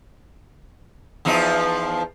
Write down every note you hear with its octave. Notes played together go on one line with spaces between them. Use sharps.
E2 F3 D#4